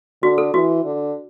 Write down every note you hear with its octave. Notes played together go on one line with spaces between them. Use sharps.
D3 F#4
A4
E3 F#4
D3